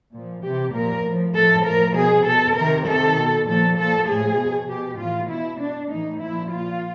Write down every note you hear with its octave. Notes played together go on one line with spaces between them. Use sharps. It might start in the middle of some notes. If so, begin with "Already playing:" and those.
A#2 F3
C3 E3 G4
A#2 F3 A#4
A2 F3
A2 F3 A4
A2 F3 A#4
B2 G#4
B2 A4
C3 D#3 A#4
C3 D#3 A4
B2
A#2 F3 A4
A#2 F3 A4
A2 F3 G#4
B2
B2 G4
A2 E3 F4
B2 E4
B2 D4
A2 E3 D#4
A#2 F3 E4
A#2 F3 F4